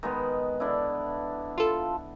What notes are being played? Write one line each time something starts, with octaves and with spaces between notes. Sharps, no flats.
D#3 G#3 B3
D3 D4 E4
F4 A4